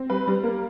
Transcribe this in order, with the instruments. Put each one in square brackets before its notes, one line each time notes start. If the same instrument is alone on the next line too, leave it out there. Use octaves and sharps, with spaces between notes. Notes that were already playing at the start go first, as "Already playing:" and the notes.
Already playing: [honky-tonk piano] C4
G3 B4
G3
A#3